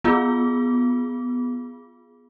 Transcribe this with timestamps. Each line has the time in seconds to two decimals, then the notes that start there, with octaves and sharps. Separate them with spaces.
0.04 B3 F4 G#4